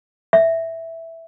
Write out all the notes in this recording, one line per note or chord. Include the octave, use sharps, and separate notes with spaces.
E5